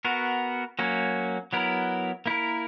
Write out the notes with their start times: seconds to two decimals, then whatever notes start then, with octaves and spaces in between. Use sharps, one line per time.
0.05 B3 F#4 A#4
0.79 F#3 A#3 C#4
1.53 F#3 B3 E4 A#4
2.26 A#3 E4 A#4